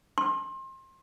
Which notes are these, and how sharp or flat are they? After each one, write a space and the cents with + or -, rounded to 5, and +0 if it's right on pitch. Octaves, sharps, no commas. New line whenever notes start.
C6 +30